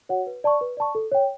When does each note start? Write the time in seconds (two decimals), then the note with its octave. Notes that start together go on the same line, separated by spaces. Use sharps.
0.09 F#4 C#5 F#5
0.27 B4
0.44 D5 A5 C#6
0.61 B4
0.77 D5 A5 C#6
0.95 A4
1.12 C#5 G5